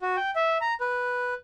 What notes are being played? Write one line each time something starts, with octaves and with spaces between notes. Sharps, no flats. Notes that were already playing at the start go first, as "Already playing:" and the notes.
F#4
G5
E5
A#5
B4